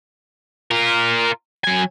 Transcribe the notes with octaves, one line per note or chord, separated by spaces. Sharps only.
F4 A#4
F#3 G#5